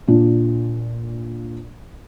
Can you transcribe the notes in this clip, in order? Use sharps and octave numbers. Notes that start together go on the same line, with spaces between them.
A#2 D4 F4